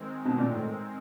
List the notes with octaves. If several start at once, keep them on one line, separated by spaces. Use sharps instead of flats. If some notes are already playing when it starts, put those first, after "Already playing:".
Already playing: D#3 G#3 C4
B2
A#2
A2